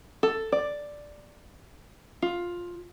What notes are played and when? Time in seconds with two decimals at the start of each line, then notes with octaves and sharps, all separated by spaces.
0.23 A4
0.52 D5
2.22 F4